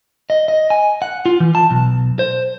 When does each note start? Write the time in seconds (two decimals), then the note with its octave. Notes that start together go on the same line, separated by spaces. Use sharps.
0.30 D#5
0.48 D#5
0.70 G#5
1.02 F#5
1.26 F4
1.40 E3
1.55 A5
1.71 B1
2.19 C5